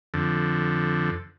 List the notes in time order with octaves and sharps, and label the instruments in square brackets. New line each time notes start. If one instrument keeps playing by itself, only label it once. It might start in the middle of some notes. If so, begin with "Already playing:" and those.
[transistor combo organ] F2 D3